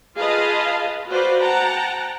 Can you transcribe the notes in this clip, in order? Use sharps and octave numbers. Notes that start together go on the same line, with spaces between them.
F4 G#4 B4 D#5 F5 A5
F#4 B4 C5 D5 F5
F#5 G5 A5 A#5